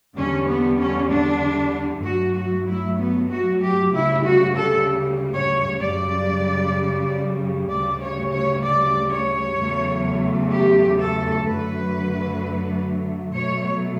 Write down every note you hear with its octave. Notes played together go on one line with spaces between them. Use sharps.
E2 D3 G3 C#4
B3
C#4
D4
G2 F#3 A3 F#4
F#4
E4
B3
F#4
G4
D2 C#3 G3 E4
F#4
A4
C#5
F#2 C#3 G3 D5
D2 C#3 G3 D5
C#5
C#5
D5
C#5
E2 C#3 F#3 A3
G4
A4
F#2 D3 F#3 A3 B4
B2 F#3 A3 C#5